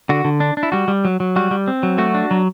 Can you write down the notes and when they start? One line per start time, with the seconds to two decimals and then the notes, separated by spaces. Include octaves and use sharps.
0.09 D3 F#4
0.25 D3
0.40 D4
0.57 D4
0.63 E4
0.72 G3 F#4
0.88 G3
1.05 F#3
1.20 F#3
1.36 G3 F#4
1.51 G3
1.68 C4
1.83 F#3
1.98 A3 F#4
2.14 D4
2.31 F#3